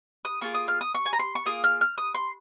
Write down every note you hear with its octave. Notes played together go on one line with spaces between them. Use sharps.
D#6
A#3 F4 G#4 C#6
D#6
F6
D#6
C#6
G#5
A#5
C6
C#6
A#3 F4 G#4 D#6
F6
F6
D#6
C6